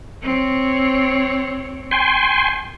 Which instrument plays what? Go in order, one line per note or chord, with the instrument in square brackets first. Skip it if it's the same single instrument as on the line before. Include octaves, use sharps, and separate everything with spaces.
[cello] C4 C#5
[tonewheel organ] G5 G#5 C6